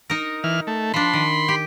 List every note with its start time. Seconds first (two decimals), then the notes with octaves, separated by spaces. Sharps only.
0.10 D#4 A#4
0.44 E3 F6
0.67 A3
0.94 F3 D4 B5 C6
1.14 D#3
1.48 G4